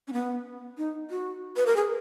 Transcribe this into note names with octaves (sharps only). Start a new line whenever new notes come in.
C#4
B3
D#4
F#4
B4
A#4
G#4